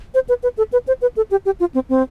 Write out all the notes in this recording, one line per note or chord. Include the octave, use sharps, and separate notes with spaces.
C5
B4
B4
A4
B4
C5
B4
A4
G4
G4
F4
C4
C4